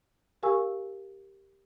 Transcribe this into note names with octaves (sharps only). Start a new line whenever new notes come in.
G4 A#4 F5 G#5 C#6 E6